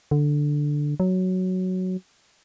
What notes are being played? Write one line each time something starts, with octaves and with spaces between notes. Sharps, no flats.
D3
F#3